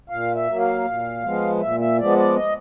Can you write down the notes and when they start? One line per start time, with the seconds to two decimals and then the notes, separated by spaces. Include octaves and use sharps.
0.09 A#2 F5
0.35 E5
0.48 F#3 A#3
0.60 F5
0.85 A#2
1.24 F3 G#3 B3
1.60 A#2 E5
1.80 E5
1.98 F3 G#3 B3 D5
2.18 D5
2.37 D#5